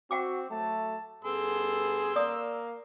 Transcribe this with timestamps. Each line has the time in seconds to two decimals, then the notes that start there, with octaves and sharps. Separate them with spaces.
0.11 C4 F#4 F#5 G5 D6
0.51 F#3 A3 A5
1.24 G2 B3 G#4 A4 C6 E6
2.16 A#3 D5 D#6